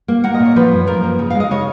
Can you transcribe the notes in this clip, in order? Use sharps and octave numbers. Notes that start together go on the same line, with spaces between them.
A#3
A#3 F#5
D#5
A#2
C#5
F3 B4
F#2
F3 A#4
A#3
C#3
F5
G#3
D#5
C#3 C#5